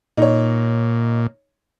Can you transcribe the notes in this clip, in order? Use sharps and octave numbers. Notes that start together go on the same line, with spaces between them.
A#2 D#4 C#5